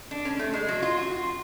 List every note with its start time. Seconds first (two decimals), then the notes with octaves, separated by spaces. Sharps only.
0.11 D4
0.25 C#4
0.39 A3
0.54 G#3
0.69 F#3
0.82 F4
0.97 F#4
1.11 F4